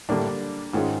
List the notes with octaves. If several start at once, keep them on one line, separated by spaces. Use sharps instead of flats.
A2 D3 G3 A#3 D4
G#2 D#3 G#3 C#4 F4 G#4